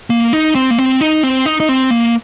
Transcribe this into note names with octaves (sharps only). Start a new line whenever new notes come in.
A#3
D#4
C4
A#3
C4
D#4
C4
D#4
D#4
C4
A#3